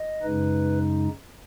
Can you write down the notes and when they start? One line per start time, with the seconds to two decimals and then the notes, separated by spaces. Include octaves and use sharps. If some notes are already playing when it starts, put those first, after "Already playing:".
Already playing: D#5
0.22 F#2 C#3 G#3 D#4 B4